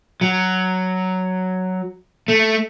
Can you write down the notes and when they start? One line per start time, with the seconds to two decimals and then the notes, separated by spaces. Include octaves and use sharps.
0.21 F#3
2.28 A3